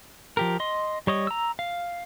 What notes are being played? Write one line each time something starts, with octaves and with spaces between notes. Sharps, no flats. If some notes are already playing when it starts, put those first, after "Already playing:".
F3 G4 A#4
D#5 C6
G3 C#5 D#5
A#5 E6
F5